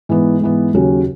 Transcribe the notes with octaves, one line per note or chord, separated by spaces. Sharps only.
G#2 E3 B3
G#2 E3 B3
D#2 C#3 F#3 C#4 F#4